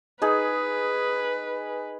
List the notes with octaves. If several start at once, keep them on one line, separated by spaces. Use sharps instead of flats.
D#4 G#4 B4